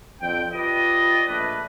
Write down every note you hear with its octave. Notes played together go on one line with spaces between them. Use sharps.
F2 D3 C4 G5
F4 G4 B4 D5 D#5
A#1 A3 D4 B4